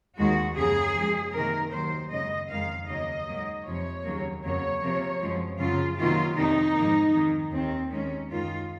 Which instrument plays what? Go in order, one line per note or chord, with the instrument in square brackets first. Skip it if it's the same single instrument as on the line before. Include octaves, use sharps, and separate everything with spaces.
[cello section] D#2 D#3 G#3 F#4
F#2 C#3 F3 A#3 G#4
F#2 F3 G#3
C3 D#3 A#3 A#4
D#2 D#3 F#3 C5
F#2 C#3 G#3 D#5
F2 D#3 G#3 F5
D#2 C#3 F#3 A#3 D#5
G#2 F#3 A#3
F2 C3 F3 C#5
D#2 C#3 F#3 A#3
F2 C#3 F#3 A#3 C#5
C3 F3 A#3
F#2 F3 G#3
F#2 C#3 F#3 F4
C3 D#3 F#3 A#3 F4
F2 C3 D#3 A#3 D#4
G#2 F3 A#3
F2 D#3 A#3
D#2 D#3 A#3 C4
D#2 D#3 G#3 C#4
F#2 D#3 G#3 F4